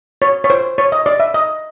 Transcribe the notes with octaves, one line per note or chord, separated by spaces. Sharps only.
C#5
C#5
C5
C#5
D#5
D5
E5
D#5